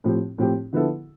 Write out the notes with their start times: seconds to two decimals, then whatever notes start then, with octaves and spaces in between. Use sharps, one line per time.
0.04 A2 F3 C4 G4
0.38 A2 F3 C4 G4
0.73 D3 F3 B3 E4 A4